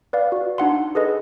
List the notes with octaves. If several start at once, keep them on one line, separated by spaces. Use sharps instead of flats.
B4 D5 F5
F#4
D4 D#4 F#5 C6
G#4 A4 B4 D#5